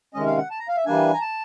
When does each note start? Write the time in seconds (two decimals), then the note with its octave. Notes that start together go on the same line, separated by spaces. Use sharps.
0.14 C3 D#3 G#3 C#4 D#5
0.26 F5
0.38 F#5
0.51 A5
0.59 A#5
0.68 F5
0.77 E5
0.86 E3 G3 A#3 D4 G#5
1.14 A#5
1.21 A5